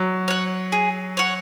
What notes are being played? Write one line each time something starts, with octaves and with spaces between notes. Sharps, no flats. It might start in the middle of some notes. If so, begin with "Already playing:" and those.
Already playing: F#3
C#5 F#5
G#4
C#5 F#5